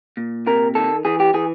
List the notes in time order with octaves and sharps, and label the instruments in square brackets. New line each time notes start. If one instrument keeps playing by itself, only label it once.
[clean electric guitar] A#2
C3 A#4
D#3 A4
E3 G#4
G4
E3 G#4